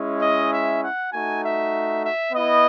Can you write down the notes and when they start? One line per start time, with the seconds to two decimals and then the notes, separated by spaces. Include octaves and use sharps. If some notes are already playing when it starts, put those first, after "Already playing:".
Already playing: G#3 C#4 E4
0.20 D#5
0.51 E5
0.80 F#5
1.12 A3 D#4 F#4 G#5
1.42 E5
2.03 E5
2.33 B3 E4 D#5